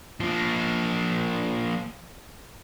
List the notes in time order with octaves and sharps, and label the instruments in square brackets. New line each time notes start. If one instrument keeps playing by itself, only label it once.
[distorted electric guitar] F3 A#3